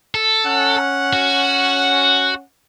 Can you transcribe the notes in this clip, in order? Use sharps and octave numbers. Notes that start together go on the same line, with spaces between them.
A4
C#4 F#5
F#4